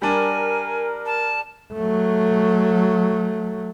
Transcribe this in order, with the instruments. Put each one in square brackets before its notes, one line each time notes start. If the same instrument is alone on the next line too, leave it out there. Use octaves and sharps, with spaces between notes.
[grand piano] G3 D4 [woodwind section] A#4 [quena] G#5
[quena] A5
[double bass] F#3 A3